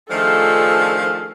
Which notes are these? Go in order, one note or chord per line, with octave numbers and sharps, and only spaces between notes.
D#3 F3 A3 D4 G#4 A4 F5